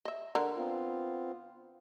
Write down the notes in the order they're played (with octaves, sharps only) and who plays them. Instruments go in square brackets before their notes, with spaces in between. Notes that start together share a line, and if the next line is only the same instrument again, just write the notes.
[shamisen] D#5 E5
D3 A#4
[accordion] B3 C4 F4